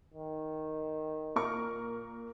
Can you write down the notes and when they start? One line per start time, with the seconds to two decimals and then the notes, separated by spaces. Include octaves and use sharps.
0.14 D#3
1.36 A#2 A#4 C#6